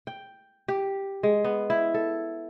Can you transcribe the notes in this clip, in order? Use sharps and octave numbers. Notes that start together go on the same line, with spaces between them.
G5
G4
G#3
B3
E4
A4